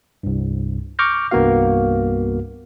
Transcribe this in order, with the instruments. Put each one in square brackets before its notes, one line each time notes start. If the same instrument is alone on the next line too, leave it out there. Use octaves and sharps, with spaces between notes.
[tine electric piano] C2 G2
C#6 D6 F6 G6 A#6
C2 G2 A#3 B3 F#4 F5